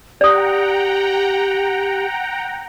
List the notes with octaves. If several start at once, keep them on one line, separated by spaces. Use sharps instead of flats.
G4 D5 F#5 G5 A#5 D#6